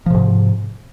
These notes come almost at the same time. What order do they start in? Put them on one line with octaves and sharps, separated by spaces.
F3 C3 G#2